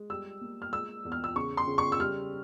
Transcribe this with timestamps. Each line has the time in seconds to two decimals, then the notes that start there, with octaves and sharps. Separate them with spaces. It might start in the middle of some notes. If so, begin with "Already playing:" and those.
Already playing: G#3
0.10 G3 E6
0.41 A#3
0.62 F6
0.73 G#3 E6
1.05 E2
1.12 F6
1.24 E6
1.36 C#3 C#6
1.57 C6
1.67 C#3
1.78 C#6
1.92 E6
2.00 G3 F6